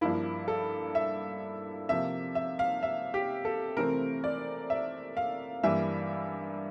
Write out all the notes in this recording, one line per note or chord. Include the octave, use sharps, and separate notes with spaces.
G2 F3 A#3 E4
A4
E5
C3 F3 A#3 E5
E5
F5
E5
G4
A4
C3 E3 A3 C4 A#4
D5
E5
F5
G2 E3 G3 A#3 E5